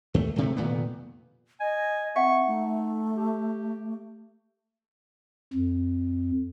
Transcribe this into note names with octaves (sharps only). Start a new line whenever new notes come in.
D#2 A3
D1 C3 A3
F1 A#2 D#3 B3
D#5 G#5
C4 E5 F#5 C#6
A3 D#4
G4
F2